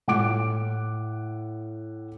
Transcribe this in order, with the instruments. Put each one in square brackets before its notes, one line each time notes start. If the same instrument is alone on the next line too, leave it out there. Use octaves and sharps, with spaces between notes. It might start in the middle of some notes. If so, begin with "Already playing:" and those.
[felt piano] A2 F#5 D6 D7